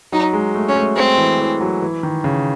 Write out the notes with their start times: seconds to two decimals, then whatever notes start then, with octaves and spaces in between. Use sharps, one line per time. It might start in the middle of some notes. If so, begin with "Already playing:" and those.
0.12 F#3 D#4
0.33 G#3
0.55 A3
0.69 C#4
0.76 A3
0.97 G#3 C4
1.18 E3
1.40 E3
1.61 F#3
1.82 E3
2.03 D#3
2.24 C#3